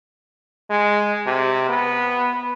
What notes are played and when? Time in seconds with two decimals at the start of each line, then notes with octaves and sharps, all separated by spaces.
0.70 G#3
1.26 C3
1.69 B3